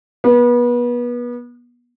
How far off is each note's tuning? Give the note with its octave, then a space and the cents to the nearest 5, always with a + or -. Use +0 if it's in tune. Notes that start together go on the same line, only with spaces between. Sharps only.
B3 -30